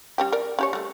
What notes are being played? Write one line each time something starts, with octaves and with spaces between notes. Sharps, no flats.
G3 C#4 G4
A#4 D5
C#4 G4 C#5
G3 A3